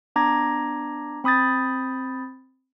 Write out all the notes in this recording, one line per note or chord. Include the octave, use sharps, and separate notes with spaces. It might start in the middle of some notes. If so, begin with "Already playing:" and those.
B3 D4 A#5 D6 G#6 A#6
C4 B5 D#6 G6 A6